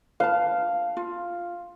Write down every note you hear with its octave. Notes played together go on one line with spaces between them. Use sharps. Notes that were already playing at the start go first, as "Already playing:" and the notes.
B4 F5 A5
F4